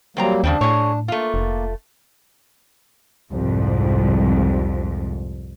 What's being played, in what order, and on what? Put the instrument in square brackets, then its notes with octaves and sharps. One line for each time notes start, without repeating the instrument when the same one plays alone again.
[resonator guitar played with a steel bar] E2 C4 A#5 [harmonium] F#3 G3 A#3
[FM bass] D#2 [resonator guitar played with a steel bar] C#3 G3 C4 [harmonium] D4
[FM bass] A2 [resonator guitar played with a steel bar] G#4 C#5
[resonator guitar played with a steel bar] A3 F4 [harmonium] A#3
[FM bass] F1
[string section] C2 F2 G#2